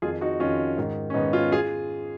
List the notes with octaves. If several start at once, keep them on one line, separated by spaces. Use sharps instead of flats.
F2 D#3 F4 G#4
D#4 F#4
F2 D#3 C#4 F4
G#2 D#3
C#4
G#2 D#3 B3 D#4
C#4 F4
F4 G#4